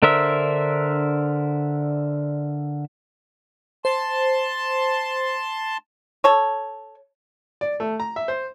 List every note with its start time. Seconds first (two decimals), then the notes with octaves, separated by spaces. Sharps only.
0.03 D3 D4 A#4 C5 E5
3.85 C5 A5 C6
6.24 A4 C#5
7.61 D5
7.80 A3
8.00 A#5
8.16 E5
8.28 C5